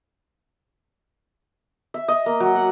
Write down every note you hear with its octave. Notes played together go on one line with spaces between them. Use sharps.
E5
D#5
A#3
F#3
F#5